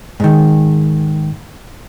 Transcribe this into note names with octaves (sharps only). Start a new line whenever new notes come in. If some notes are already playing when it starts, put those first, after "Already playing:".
G#2 D#3